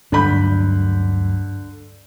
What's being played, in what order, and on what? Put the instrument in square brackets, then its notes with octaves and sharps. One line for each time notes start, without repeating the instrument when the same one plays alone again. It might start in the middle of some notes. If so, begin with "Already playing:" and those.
[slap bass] D2 G2 F#3 [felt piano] D3 B5 G6